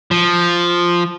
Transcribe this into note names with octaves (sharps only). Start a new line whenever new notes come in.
F3